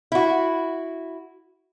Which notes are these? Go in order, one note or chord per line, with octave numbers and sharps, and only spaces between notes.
E4 F#4